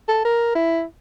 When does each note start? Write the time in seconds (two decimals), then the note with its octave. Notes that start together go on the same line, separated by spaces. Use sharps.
0.09 A4
0.25 A#4
0.55 E4